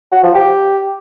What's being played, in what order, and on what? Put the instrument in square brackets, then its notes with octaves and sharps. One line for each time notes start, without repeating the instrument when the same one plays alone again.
[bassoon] F#4
F3
G4